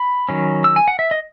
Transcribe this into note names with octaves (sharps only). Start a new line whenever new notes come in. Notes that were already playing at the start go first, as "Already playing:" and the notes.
Already playing: B5
D#3 F#3 C#4
E6
G#5
F#5
E5
D#5